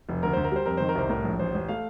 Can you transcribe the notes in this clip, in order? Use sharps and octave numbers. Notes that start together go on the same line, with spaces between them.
F1
D2 A#4
D2 C5
A#4
G3 C5
F2 A#4
D#3 C5
A#4
C2 C5
A2 A#4
A#1
A1 C5
A1
A3 F5